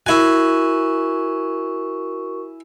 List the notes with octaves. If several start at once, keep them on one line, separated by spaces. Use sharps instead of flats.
E4 F#4 A#4 G#5 C#6